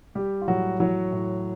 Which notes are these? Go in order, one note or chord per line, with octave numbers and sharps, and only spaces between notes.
G3 G4
F4
A2 F#3 F#4
E3 F#3 F#4
A2